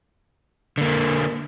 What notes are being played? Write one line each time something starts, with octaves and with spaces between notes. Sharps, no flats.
D3 A#3